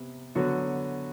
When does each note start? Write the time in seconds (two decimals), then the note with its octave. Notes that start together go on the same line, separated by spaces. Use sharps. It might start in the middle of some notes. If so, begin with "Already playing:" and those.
Already playing: C3 B3
0.35 D3 F#3 B3 F#4